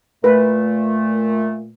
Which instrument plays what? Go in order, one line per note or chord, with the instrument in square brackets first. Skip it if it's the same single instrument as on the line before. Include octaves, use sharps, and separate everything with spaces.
[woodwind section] A#2 A3 [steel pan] B4